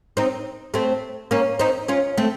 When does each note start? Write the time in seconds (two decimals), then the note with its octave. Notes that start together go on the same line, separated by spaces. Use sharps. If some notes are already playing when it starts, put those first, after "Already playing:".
0.17 C4 D#4
0.74 A3 C4
1.31 A#3 C#4
1.59 C4 D#4
1.88 C#4 F4
2.17 A3 C4